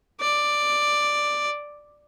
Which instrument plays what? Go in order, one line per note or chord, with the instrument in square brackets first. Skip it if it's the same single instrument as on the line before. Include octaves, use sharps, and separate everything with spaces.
[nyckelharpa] D5